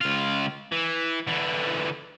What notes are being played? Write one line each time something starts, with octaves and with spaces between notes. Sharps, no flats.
C#2 F4
E3
D3 E3